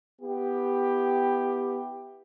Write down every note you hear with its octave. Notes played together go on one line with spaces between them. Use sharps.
B3 E4 G4